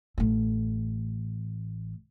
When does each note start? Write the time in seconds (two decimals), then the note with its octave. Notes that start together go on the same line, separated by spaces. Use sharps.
0.18 A1 A3